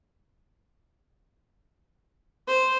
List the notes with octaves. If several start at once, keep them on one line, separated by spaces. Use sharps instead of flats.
C5